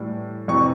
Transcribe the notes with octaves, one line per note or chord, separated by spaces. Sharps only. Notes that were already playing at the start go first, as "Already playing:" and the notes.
Already playing: A2 E3 G3
F2 C3 E3 C#6